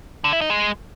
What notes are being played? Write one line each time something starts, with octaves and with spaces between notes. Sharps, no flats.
D3
E4
D#4
G#3